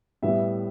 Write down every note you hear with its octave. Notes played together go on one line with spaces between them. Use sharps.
A2 G3 B3 E5